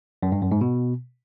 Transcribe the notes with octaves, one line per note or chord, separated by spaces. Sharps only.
F#2
G2
F#2
G#2
B2